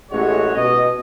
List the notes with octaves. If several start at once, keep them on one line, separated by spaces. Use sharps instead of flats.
A1 G#3 F#4 C#5
B2 D#5